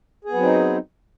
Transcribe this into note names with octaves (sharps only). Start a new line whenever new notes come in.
F#3 B3 C4 D#4 G#4